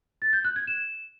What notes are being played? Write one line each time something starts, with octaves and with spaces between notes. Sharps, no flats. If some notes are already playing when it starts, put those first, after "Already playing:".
A6
G6
F#6
G#6
E7